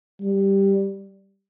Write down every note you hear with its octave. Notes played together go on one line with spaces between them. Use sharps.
G3